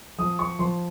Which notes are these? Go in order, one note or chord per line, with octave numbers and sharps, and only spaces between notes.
F3 D#6
C#6
F3 C6